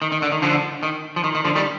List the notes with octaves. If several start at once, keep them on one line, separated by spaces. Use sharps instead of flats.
D#3
D#3
D3
D#3
D3 F3
D#3
F3
D#3
D#3
D3 F3
D#3 G3